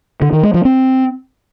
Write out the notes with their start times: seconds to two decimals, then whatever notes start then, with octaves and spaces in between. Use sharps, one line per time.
0.22 D3
0.32 D#3
0.43 G#3
0.54 F3
0.65 C4